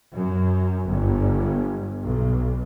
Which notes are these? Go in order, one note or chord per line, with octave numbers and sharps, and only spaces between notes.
F#2
G1
B1